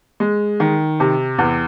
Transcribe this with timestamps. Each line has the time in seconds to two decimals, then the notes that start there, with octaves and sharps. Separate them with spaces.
0.20 G#3
0.60 D#3
1.00 C3
1.39 E2